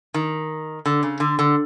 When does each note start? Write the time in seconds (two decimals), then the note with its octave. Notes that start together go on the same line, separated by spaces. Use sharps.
0.14 D#3
0.86 D3
1.03 C#3
1.20 D3
1.39 D3